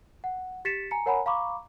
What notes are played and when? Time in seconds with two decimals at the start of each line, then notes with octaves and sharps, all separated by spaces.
0.24 F#5
0.65 G4 A6 B6 C#7 E7
0.91 G#5 A#5 C#7
1.06 A#4 C#5 F#5 G#5 A#5 B5
1.26 F5 A#5 B5 C#6 D6